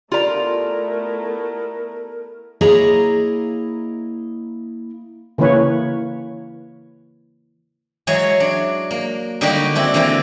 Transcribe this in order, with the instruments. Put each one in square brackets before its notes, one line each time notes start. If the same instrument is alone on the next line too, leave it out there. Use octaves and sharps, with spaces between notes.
[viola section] A3 B3 E4 [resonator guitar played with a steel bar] F4 A#5 [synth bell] G4 D5 [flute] A#4
[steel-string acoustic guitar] A#3 E4 G#4 C#5 D#5 A#5
[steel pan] C#3 E3 A#3 B4 C#5
[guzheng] E3 F#3 G#3 G#4 C#5
D4
A#3
D3 G3 A#3 D#4 F#4 G4
C4 D4 E4
D3 E3 A#3 C4 E4